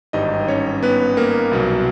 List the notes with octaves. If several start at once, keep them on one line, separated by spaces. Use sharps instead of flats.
G#1 G2 E3 G3 D#4 D#5
C#4 C#5
B3 B4
A#3 A#4
C2 B2 F#3